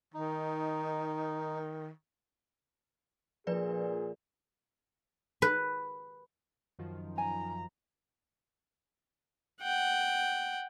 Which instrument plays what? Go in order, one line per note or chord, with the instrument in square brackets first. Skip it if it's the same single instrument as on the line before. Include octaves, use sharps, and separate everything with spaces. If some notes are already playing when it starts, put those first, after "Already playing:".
[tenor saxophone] D#3 [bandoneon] D#4
[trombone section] A#2 G#4 [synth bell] F3 B4 D5
[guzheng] B4
[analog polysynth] F#2 D#3 F3
[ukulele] G#5 [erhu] A#5
[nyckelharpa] F#5 G5